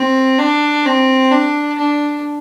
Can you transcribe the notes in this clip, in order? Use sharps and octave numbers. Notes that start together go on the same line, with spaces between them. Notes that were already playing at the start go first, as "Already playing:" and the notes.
Already playing: C4
D4
C4
D4
D4